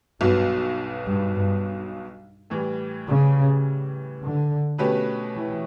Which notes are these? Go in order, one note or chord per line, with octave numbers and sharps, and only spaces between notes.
B1 G2 B2 F#3 B3
G2
G2
A2 E3 G3
C#3
D3
B2 A3 C#4 G4 B4
E3